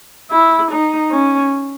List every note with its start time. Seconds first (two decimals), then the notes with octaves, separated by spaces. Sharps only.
0.31 E4
0.71 D#4
1.11 C#4